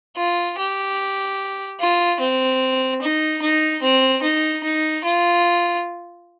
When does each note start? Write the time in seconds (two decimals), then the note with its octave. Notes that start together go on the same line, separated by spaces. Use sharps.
0.16 F4
0.58 G4
1.80 F4
2.20 C4
3.02 D#4
3.42 D#4
3.82 C4
4.22 D#4
4.63 D#4
5.04 F4